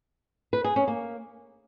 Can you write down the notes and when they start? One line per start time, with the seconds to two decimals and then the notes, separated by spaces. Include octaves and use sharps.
0.53 B4
0.64 G#4
0.76 C#4
0.88 A#3